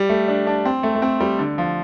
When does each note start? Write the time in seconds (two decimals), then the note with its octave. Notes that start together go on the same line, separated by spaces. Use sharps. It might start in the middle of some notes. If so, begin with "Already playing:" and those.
Already playing: G3
0.09 A3
0.28 D4
0.47 D4
0.65 C4
0.83 A3
0.95 A3
1.02 C4
1.21 G3
1.39 D3
1.58 F3